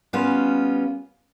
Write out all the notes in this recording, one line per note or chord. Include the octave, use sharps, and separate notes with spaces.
G3 B3 C#4 F4